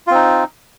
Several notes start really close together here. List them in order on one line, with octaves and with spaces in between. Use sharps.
F4 C4 D#4